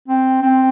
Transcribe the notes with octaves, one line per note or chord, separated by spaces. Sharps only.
C4
C4